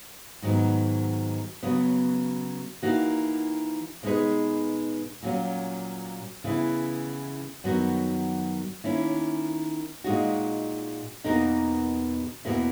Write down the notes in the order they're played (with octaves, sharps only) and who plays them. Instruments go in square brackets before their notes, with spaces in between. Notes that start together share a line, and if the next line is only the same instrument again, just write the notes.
[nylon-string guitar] G#2 D#3 F#3 B3
C#3 F#3 B3
E3 A#3 D#4 F#4
B2 G#3 D#4 G#4 B4
A#2 F#3 C#4
C#3 E3 B3 E4
F#2 D#3 F#3 B3 F#4
D#3 A#3 C#4 E4
A#2 G#3 D#4 F#4
E2 B2 A#3 D#4 A#4
E2 B2 A#3 E4 B4